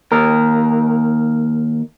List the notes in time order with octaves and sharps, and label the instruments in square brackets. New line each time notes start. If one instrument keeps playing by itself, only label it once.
[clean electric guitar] D#2 A#4